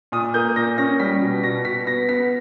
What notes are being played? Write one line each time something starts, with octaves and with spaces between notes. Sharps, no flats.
A#2 D#6
A#3 G6
A#2 A#6
C#4 A#6
G3 B6
B2
B2 A#6
B2 B6
B3 A#6
B3 B6